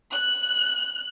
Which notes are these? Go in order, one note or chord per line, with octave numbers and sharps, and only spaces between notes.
F#6